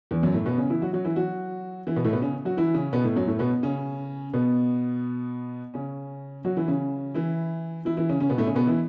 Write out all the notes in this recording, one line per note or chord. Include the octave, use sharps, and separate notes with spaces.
E2 E3
F#2 F#3
A2 A3
B2 B3
C#3 C#4
E3 E4
F#3 F#4
F#3 F#4
E3 E4
F#3 F#4
E3 E4
B2 B3
A2 A3
B2 B3
C#3 C#4
F#3 F#4
E3 E4
C#3 C#4
B2 B3
A2 A3
F#2 F#3
A2 A3
B2 B3
C#3 C#4
B2 B3
C#3 C#4
F#3 F#4
E3 E4
C#3 C#4
E3 E4
E3 E4
E3 E4
C#3 C#4
C#3 C#4
B2 B3
A2 A3
C#3 C#4
B2 B3
E3 E4